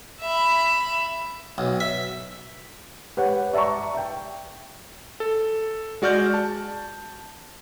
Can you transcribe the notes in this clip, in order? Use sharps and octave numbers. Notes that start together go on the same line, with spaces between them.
E5 B5
B1
E5
G4 B4 C#5 F#5
D5 E5 A5 A#5 C#6
E5 G5
A4
G#3 F#4 D5 F6 G6
A5